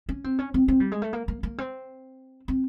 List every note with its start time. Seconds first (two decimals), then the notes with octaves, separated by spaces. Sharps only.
0.09 C#4
0.24 C4
0.39 C#4
0.54 C4
0.68 C4
0.80 G3
0.92 G#3
1.02 A3
1.13 A#3
1.28 A#3
1.43 A#3
1.58 C4
2.48 C4